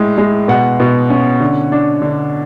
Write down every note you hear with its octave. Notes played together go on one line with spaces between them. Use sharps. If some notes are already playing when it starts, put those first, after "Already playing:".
Already playing: A2 G#3
G#3
B2 F#5
B2
C#4
D3
D4
D3